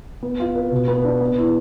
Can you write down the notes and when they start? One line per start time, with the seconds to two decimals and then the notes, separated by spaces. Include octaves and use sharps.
0.23 B3
0.40 F4
0.55 B4
0.71 B2
0.88 B3
1.05 D4
1.21 B3
1.38 E4